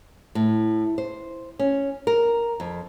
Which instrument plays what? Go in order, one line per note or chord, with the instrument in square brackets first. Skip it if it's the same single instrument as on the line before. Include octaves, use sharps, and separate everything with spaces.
[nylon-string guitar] A2
C5
C#4
A#4
F2